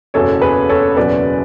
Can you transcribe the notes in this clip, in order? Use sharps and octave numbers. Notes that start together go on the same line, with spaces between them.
F#1 E2 B2 A4 C#5
G#4 B4
A4 C#5
F#1 E2 B2 F#3 B4 D5